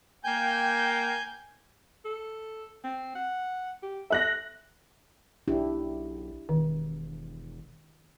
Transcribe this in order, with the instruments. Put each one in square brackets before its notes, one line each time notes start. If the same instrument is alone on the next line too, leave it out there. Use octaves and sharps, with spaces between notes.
[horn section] A#3 G5 [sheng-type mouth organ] G#5 G6
[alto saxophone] A4
C4
F#5
G4
[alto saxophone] A4 [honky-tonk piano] E5 F#6 A#6
[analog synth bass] B1 [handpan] D4 E4 G4
[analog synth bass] E1 [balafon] D#3